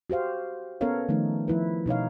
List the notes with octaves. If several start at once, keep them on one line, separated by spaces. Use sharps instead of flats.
F#4 G4 C5 F5
B3 C#4 A4 A#4 C#5 F5
D#3 F3 A3 D#4
F3 E4 B4
B2 D#4 C#5 F5